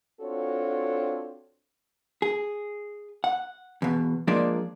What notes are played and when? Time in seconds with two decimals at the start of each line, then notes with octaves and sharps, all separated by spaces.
0.21 C4 D4 F4 F#4 A4 C#5
2.22 G#4
3.24 F#5
3.82 E2 B2
4.27 F3 G#3 A#3 D4 D5